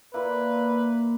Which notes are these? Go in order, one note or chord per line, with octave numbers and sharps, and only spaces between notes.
A#2 A#3 E4 B4